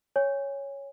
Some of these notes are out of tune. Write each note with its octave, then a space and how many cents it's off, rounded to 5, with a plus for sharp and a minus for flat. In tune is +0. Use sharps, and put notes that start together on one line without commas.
C#5 +0 G#5 -25